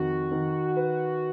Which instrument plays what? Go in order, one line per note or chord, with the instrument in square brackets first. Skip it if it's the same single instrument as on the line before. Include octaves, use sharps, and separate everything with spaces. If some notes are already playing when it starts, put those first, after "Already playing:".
Already playing: [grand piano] F2 D#3 [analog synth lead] F#4
[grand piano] D#3
B4